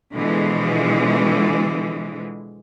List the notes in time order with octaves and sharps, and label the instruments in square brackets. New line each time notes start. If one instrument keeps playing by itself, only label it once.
[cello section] B2 D3 E3 F3 G#3